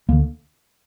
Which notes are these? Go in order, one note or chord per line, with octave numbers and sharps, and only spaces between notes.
D2 D3 A#3